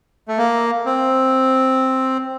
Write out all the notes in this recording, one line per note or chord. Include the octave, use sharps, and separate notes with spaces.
A3
A#3
C4